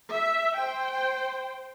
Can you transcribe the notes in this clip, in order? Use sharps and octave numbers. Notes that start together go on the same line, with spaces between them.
E5
C5 G5